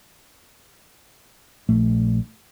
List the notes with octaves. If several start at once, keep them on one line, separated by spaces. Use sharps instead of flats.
A#1 A3